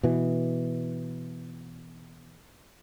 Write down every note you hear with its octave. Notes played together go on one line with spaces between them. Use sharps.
B2 E3